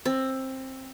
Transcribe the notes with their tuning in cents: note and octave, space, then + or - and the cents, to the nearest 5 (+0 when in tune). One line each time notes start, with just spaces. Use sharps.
C4 +15